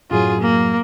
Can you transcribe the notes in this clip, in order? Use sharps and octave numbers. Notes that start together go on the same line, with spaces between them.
F#2 A2 F#3 F4 G#4
A#3